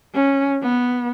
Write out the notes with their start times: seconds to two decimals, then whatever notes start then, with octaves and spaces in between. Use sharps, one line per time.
0.14 C#4
0.63 B3